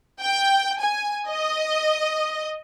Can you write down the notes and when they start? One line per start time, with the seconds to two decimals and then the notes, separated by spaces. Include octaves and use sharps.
0.21 G5
0.79 G#5
1.29 D#5